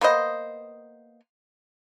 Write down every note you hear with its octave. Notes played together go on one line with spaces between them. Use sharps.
A#3 B3 C5 D#5